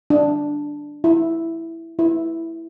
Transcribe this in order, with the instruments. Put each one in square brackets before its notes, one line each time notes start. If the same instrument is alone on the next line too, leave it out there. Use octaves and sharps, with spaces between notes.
[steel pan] D4
E4
E4